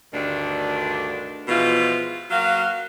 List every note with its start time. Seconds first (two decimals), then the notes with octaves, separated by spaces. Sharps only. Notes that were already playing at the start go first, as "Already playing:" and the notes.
0.13 D2 G2 D3 D#3 D4
1.48 B2 E3 F3 G#3 F4
2.31 F#3 A#3 F#4 F5